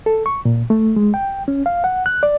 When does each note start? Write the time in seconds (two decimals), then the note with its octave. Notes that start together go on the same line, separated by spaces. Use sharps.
0.06 A4
0.26 C#6
0.45 A#2
0.70 A3
0.96 G#3
1.14 G5
1.48 C#4
1.66 F5
1.84 F#5
2.06 F#6
2.23 D5